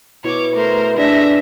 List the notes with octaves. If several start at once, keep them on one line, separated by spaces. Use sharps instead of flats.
B2 E4 C#5 D6
A3 A#4 C5
D4 G#4 E5 A#6